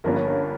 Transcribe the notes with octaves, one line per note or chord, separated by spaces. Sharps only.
G1 G2 F3 A#3 C#4 A#4
C#5
A#4